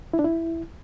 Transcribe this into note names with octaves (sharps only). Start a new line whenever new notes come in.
E4
D4
E4